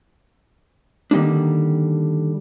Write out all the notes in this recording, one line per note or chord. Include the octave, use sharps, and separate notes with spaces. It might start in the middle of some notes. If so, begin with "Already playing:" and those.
D3 D#3 F#3 G3 A#3 D4